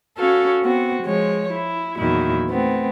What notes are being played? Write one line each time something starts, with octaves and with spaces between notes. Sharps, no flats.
C#4 F#4 A4 F5
B3 C4 F#4
F3 G#3 C#5
E4
E2 A#2 D#3 F#3 E4
A3 B3 C4